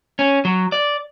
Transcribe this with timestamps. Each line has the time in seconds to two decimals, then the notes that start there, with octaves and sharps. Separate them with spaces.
0.19 C#4
0.45 F#3
0.72 D5